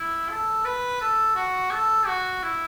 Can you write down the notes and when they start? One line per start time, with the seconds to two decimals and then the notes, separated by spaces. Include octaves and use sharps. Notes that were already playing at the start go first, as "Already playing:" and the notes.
Already playing: E4
0.29 A4
0.65 B4
1.01 A4
1.36 F#4
1.71 A4
2.07 F#4
2.43 E4